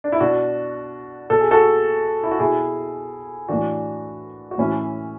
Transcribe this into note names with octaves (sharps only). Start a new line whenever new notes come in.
D4
E4
B2 D4 F#4
B2 A4
G#4
F#4 A4
E4
F#4
B2 E4 G#4
A2 E3 D4 F#4
F#4
A2 E3 C#4 E4